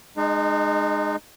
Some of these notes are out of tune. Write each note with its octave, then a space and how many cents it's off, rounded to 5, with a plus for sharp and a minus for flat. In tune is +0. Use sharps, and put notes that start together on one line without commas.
G#3 +0 D#4 -35